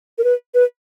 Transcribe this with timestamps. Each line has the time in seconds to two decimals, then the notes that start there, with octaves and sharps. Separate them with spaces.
0.18 A#4
0.24 B4
0.54 B4